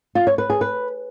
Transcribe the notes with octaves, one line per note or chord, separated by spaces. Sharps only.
F4
C#5
B4
G#4
B4